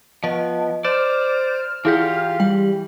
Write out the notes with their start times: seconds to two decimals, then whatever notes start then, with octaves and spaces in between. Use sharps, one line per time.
0.24 F3 B3 D#5
0.85 C5 D5 F6 E7
1.85 E3 E4 F4 G4 G#4
2.40 G3 G5